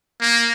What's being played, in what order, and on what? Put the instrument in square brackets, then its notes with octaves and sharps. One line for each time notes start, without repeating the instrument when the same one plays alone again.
[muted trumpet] A#3